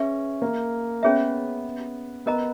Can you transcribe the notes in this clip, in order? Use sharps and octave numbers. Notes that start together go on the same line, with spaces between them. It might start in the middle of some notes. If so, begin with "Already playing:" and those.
Already playing: C#4 G#4 B4 E5
A#3
B3 C#4 G#4 C#5 E5
B3 A#4 D#5 A#5